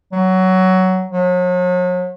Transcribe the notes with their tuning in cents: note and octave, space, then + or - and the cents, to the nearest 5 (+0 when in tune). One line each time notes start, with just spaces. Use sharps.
F#3 +15
F#3 -40